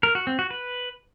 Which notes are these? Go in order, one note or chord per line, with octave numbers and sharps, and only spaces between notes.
A#4
F#4
C4
F#4
B4